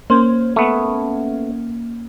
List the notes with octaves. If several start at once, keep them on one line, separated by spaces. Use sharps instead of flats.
A#3 C#4 C5
A3 B3